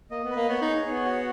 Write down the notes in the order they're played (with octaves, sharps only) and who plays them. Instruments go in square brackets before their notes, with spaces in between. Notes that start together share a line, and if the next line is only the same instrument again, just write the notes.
[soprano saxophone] A#3 [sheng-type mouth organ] D#5
[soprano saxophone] B3
[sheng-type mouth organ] B4
[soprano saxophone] A#3
[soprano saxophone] B3 [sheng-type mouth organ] C#5
[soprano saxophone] D#4
[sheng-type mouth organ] G#4
[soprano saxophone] B3 [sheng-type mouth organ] C#5
[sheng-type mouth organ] F#4